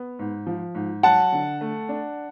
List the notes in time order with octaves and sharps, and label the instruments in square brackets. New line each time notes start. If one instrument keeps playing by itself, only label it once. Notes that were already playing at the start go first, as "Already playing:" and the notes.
Already playing: [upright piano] B3
G#2
F3
G#2
[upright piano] F#3 [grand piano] F#5 A5
[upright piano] D3
A3
D4